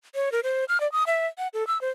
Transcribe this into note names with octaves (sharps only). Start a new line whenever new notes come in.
C#5
A#4
C5
F6
D5
D#6
E5
F#5
A4
E6
C5